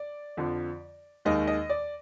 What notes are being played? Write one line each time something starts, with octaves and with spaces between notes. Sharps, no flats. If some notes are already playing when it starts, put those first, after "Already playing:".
Already playing: D5
F2 D3 F3
D#2 D#3 G#3 D#5
D#5
D5